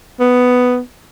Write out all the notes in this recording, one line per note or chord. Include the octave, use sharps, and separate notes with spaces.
B3